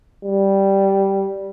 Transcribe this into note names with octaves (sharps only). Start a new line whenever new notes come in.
G3